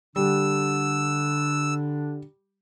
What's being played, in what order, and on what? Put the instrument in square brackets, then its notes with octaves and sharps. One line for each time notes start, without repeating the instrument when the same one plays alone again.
[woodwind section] D3 D4 [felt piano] G3 [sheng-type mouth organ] E6